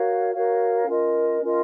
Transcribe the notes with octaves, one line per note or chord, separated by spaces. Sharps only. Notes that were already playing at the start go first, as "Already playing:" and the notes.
Already playing: F#4 A#4 C#5 F5
F#4 A#4 C#5 F5
C#4 F4 A#4 D#5
C#4 F4 A#4 D#5